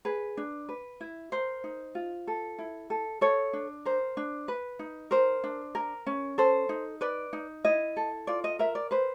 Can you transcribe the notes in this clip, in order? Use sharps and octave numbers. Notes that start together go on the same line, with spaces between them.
G#4 B4
D4
B4
E4
A#4 C5
D#4
F4
A4
E4
A4
A4 C#5
D4
A#4 C5
D4
B4
D#4
A#4 C5
D4
A#4
C#4
A4 C5
D#4
B4 D5
D#4
E4 D#5
A4
F4 D5
D#5
A#4 E5
D5
B4 C5